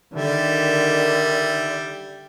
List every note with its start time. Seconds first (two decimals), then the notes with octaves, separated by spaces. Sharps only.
0.14 D3 D#3 G3 E5